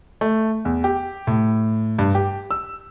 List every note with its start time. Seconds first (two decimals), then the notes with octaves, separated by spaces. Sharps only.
0.21 A3
0.65 E2
0.84 G4
1.27 A2
1.99 G2
2.15 G4
2.51 E6